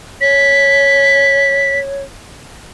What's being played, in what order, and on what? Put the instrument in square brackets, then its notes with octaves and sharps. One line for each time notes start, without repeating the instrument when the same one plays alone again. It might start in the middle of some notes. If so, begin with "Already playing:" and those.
[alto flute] C#5 [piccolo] B6